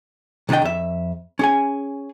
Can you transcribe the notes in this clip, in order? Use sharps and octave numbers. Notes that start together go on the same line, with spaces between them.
C2 D#3 D4 D#5 G5
F2 E5
C#4 G#4 G#5